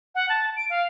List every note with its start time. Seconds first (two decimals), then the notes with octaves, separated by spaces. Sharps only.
0.15 F#5
0.29 A5
0.56 D7
0.70 F5